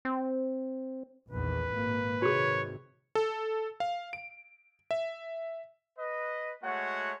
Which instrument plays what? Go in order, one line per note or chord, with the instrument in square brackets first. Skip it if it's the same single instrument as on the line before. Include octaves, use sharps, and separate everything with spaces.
[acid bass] C4
[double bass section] A#1 E2 D#3 [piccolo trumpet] B4
[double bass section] G#1 A#2 A#3
[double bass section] G#2 C3 D#3 [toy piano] F#4 G#4 [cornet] C#5
[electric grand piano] A4
F5
D7
E5
[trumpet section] B4 D#5
G#3 A3 F#4 C#5 F#5